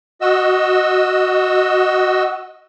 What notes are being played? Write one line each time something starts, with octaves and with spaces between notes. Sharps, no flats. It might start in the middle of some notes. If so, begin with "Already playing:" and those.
F#4 D#5 E6